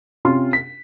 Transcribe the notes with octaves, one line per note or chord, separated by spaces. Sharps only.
C3 C#4 F4 C6 F6
B6